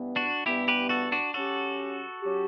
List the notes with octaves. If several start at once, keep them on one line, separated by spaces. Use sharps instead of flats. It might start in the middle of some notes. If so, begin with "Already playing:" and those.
Already playing: G2 E3 B3
D4 F#4
G2 E3 B3 E4 G4
G4 B4
F#4 A4
D4 F#4
F#3 C#4 F#4 G4 A4
F#3 C#4 G4